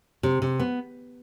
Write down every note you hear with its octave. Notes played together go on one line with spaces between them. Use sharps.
C3
C3
B3